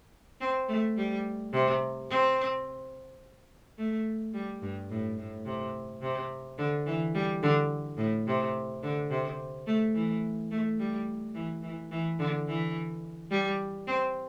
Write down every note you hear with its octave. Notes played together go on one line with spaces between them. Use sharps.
C4
A3
G3
C3
C4
A3
G3
G2
A2
A2
C3
C3
D3
E3
G3
D3
A2
C3
D3
C3
A3
E3
A3
G3
E3
E3
E3
D3
E3
G3
C4